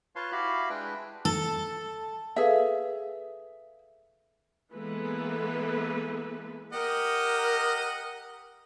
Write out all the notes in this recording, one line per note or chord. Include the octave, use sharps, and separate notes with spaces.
F4 B4 C#5 F5 A5 C6
E4 F#4 G4 F5 B5
G#3 D4 E4 B4 G5
A4
G#4 A4 B4 E5 F5
E3 G#3 A#3 B3 A4 B4
G4 A#4 D#5 F#5